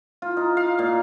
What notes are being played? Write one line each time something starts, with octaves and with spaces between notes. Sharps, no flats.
F4
D#4
F5
A#2